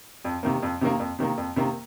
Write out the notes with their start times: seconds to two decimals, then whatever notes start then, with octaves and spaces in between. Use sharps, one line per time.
0.25 F2
0.43 C3 D#3 A#3
0.63 F2
0.81 C3 D#3 A#3
1.00 F2
1.19 C3 D#3 A#3
1.37 F2
1.56 C3 D#3 A#3